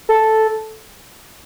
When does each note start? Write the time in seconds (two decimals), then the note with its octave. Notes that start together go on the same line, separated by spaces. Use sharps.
0.09 A4